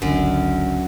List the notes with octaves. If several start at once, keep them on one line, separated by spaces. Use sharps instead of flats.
G1 C#2 F#2 D3